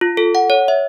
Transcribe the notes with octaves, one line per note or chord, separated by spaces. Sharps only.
F4
A4
F#5
C#5
E5